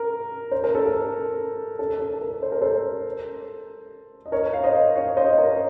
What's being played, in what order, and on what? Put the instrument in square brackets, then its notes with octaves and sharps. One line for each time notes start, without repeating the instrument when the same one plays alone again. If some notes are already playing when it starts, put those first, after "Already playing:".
Already playing: [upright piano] A#4
C5
A#4
A4
A#4
A4
A4
A#4
C5
A#4
A4 C5
D#5
A#4 C#5
F5
C5 D#5
C#5 F5
C5 D#5
A#4 C#5